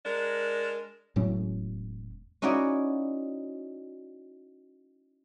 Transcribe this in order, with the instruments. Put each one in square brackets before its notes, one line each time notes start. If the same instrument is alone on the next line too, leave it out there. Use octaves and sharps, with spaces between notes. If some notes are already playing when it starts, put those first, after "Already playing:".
[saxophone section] G#3 D4 A#4
[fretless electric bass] E1 A2 F#3 C#4
[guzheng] C#4 D#4 E4 F#4 C#5 D5